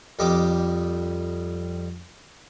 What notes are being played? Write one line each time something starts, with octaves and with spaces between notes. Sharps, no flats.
F2 G3 D#5 D6